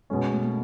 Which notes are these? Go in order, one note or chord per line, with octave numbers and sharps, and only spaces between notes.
B2 G#3 C#4
A3
A#3